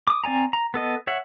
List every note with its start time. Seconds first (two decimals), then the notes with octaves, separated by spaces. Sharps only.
0.07 D6 D#6
0.24 C4 D5 G#5 A#5
0.53 A#5
0.74 B3 A4 D#5
1.07 C#5 E5 F#5